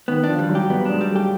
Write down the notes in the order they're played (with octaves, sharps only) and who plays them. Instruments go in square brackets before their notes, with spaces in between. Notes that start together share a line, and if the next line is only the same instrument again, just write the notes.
[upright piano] D#3 [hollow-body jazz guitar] B3
[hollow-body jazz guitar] D4
[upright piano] F3
[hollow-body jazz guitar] G3
[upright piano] F#3
[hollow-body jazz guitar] G4
[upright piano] G3 [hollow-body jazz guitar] B3
[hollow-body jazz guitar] D4
[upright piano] G#3
[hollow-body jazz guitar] G3
[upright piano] A3 [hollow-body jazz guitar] G4